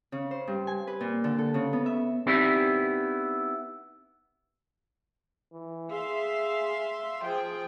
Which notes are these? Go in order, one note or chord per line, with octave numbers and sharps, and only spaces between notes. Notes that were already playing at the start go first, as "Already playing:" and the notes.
C#3
C5
G2
G#5
B4
A#2
D3
A4
C#3
B3
E5
B3 C4 D#4 E4 G4 D5
E3
G#4 E5 F5 C6
F3 G#4 G5